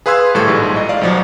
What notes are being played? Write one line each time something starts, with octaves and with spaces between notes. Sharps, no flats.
G#4 B4 F5 C6 E6 G#6
G#1 A2 G3 A4 C#6 G#6
A#1 G#2
D#5
D5 F5
C2 F3 F#3